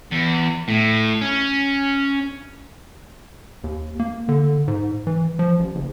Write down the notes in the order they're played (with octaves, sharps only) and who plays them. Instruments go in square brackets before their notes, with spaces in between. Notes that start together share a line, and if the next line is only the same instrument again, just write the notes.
[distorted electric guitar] E2
A2
C#4
[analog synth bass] D#2
A#3
D3
G#2
E3
F3
A1
F#1